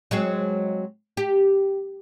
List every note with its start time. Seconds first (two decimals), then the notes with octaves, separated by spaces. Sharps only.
0.11 F#3 G#3 C4
1.17 G4